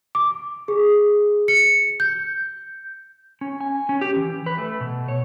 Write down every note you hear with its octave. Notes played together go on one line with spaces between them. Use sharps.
D6
G#4
C#7
G6
C#4
G#5
C#4
G4
E3
B4
A3
B2
C#5